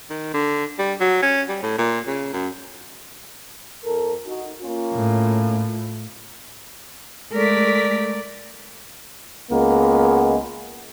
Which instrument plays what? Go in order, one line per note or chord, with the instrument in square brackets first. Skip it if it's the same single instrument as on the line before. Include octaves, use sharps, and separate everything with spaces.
[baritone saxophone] D#3
D3
G3
F#3
C#4
G3
A2
A#2
C#3
F#2
[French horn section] F2 A4 A#4
D#4 F#4
A#3 C#4 F4
[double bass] A2
[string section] G#3 A3 B6 [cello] A#4 D5
[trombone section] C#2 G#3 A#3 B3